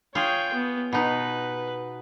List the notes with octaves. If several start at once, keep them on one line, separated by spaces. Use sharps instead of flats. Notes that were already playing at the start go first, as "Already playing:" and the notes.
F4 G#4 C#5 G5
B3
B2 D#4 B4